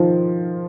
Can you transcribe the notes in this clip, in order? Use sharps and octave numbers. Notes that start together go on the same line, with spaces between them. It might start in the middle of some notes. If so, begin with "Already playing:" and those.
Already playing: D#3 F3